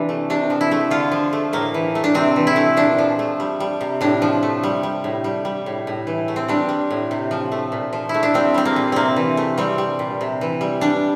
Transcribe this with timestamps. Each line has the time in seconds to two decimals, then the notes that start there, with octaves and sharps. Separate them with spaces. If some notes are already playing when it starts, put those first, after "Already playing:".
Already playing: C3 E3 D4
0.09 A3
0.30 C3 D4
0.50 F3
0.61 E4
0.71 A3
0.91 D3 F4
1.12 F3
1.33 A3
1.53 A2 A#3
1.74 E3
1.95 A3
2.04 D4
2.14 C3 C4
2.36 E3
2.47 E4
2.56 A3
2.77 A#2 D4
2.98 F3
3.19 A3
3.40 G3
3.60 G3
3.81 C3
4.01 A2 D4
4.22 F3
4.43 A3
4.63 G3
4.83 G3
5.04 A2
5.24 G3
5.45 G3
5.66 A2
5.87 A2
6.07 E3
6.28 A3
6.36 C4
6.48 G3 D4
6.69 G3
6.91 A2
7.11 C3
7.31 F3
7.52 A3
7.72 A#2
7.93 F3
8.09 E4
8.14 A3
8.23 D4
8.34 G3 C4
8.54 G3 C4
8.65 A#3
8.76 A#2
8.92 C3 A#3 C4
9.16 E3
9.37 A3
9.58 G3 C4
9.78 G3
9.99 A#2
10.21 C3
10.41 E3
10.61 G3
10.81 G3 D4